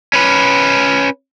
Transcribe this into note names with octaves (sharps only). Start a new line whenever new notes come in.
C#4 B4